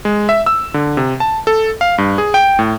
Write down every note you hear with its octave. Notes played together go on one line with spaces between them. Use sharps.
G#3
E5
E6
D3
C3
A5
A4
F5
G2
G#4
G5
A2